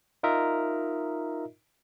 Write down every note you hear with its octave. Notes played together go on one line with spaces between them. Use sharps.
D#4 F4 A#4 D#5 E5